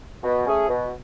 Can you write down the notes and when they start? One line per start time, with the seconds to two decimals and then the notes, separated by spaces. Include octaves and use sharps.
0.24 B2
0.46 A3 C#4 G#4
0.69 B2